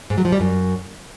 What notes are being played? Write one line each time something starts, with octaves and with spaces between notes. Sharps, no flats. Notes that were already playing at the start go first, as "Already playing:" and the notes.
G#2
F#3
F3
G3
F#2